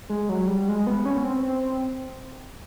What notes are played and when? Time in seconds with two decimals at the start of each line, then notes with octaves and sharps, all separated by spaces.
0.10 G#3
0.29 F#3
0.48 G3
0.68 G#3
0.87 B3
1.05 C#4
1.24 C4
1.43 C4